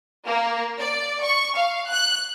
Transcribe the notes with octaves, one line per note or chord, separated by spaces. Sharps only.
A#3
D5
C#6
F5
F#6